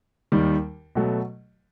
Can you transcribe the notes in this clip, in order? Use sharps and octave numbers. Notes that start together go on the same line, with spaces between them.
D#2 D#3 G3
B2 F#3 A3